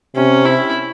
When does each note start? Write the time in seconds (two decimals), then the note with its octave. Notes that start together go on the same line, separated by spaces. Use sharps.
0.15 C3 C#4
0.45 E4